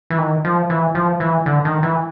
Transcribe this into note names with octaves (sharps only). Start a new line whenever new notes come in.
E3
D#3
F3
E3
F3
E3
D3
D#3
E3